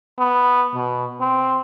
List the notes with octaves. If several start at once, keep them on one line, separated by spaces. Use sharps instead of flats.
B3
B2
C4